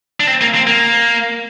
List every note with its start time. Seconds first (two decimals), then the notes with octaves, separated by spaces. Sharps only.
0.20 D4
0.27 C4
0.41 A#3
0.55 C4
0.67 A#3